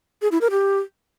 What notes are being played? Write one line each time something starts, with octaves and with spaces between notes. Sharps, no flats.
G#4
E4
A#4
G4